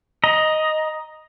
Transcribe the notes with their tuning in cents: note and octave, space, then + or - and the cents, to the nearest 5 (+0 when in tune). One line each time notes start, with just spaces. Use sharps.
D#5 +0 A#5 +25